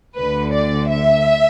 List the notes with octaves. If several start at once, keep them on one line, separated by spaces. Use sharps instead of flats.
D2 D3 B4
D5
E5